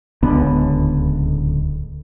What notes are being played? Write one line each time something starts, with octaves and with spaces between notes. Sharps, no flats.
D1 C#2 D3 B3